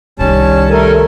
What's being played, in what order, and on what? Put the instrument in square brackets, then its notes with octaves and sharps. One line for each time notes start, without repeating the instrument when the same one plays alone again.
[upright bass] C2 D#3 [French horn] G3 [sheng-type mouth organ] C#4 A5
[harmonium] A3 A4 A#4 [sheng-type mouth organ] G#5